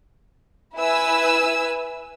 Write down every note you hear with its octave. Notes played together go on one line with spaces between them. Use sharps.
E4 B4 G#5 E6